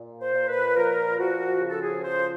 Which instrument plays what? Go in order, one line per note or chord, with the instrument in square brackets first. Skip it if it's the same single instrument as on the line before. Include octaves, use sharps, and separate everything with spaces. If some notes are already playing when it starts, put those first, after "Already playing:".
Already playing: [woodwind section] A#2
C5
A#2
B4
F3 A#4
F3 F#4
C#3
A4
G#4
F3 C5